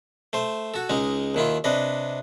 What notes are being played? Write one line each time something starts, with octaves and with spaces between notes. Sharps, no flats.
A3 C5
F#4 A4
C#2 G#3 D#4
D#2 D#3 E4 F4
C3 D4 B4 D#5